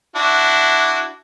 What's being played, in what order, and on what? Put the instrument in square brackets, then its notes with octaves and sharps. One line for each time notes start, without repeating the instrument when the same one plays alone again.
[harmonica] D4 E4 F#4